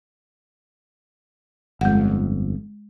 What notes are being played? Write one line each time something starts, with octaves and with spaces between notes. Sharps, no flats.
G1 F2 G#3 F#5